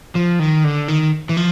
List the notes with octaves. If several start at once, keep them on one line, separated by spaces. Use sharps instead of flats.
F3
D#3
D3
D#3
E3
F3